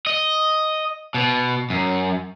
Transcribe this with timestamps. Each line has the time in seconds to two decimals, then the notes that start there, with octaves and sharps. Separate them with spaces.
0.07 D#5
1.14 B2
1.70 F#2